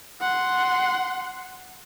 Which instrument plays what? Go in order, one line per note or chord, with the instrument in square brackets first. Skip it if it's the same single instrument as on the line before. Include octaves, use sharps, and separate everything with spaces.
[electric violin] F#5 C6